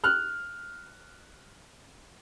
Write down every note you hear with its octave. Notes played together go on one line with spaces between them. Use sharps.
F6 F#6